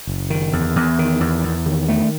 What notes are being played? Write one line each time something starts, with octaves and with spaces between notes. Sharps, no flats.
F#1
D#3
E2
E2
D#3
E2
E2
D#3
A3